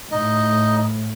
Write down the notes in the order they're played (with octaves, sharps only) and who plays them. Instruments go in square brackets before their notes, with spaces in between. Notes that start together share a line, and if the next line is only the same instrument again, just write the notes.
[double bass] A2 [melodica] D#4 D#5